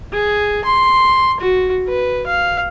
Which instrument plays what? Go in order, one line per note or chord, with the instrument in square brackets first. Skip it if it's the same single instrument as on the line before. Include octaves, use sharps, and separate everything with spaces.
[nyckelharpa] G#4
C6
F#4
B4
F5